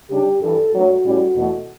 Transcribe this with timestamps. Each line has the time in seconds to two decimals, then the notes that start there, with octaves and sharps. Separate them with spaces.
0.10 C#3 G3 D4 G4
0.41 G2 E3 G3 A4
0.72 G2 F#3 A3 D4 F#4
1.04 A2 G3 C#4
1.35 E2 B2 A3